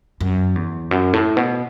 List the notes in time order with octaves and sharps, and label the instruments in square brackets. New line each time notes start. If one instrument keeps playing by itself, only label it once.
[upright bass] F#2
E2
F#2
A2
B2